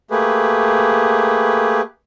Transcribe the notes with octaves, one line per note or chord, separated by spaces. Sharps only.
A3 A#3 G4 G#4 B4